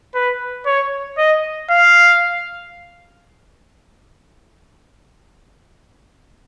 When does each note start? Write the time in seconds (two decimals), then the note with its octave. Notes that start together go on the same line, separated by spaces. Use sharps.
0.15 B4
0.66 C#5
1.18 D#5
1.70 F5